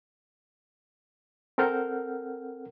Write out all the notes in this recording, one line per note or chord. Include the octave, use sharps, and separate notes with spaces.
C4 A4 A#4 F#5 F6 G6